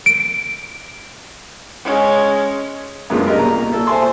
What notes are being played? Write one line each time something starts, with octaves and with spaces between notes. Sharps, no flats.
D7
G#3 C#4
F#2 C#3 G#3 B3 D4 F4
G4 A#4 D#5
C2 A#2 A#5
A#2 A4
C5 E5 G#5 A5 C6